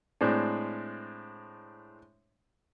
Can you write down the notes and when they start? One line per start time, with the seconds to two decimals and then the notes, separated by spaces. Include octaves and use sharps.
0.21 A2 G#3 C4 D4